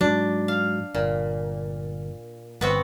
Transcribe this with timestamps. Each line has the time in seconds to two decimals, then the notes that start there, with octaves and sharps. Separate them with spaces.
0.01 G#2 F#3 D4
0.48 F5
0.94 G1 A#2
2.61 G1 B3 C4 F#4